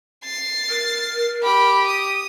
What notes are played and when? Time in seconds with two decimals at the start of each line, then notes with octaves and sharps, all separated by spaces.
0.24 A6 C7
0.70 A#4
1.43 G4 B5
1.88 D#6